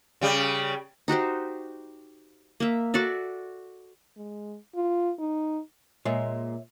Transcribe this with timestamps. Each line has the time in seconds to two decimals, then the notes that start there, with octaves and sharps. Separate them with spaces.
0.21 C#3 G3
1.08 D#4 F#4 G4 C5
2.60 A#3 E5
2.94 F#4 A4 D5 E5
4.17 G#3
4.75 F4
5.19 D#4
6.05 A#2 G#3 C#5 E5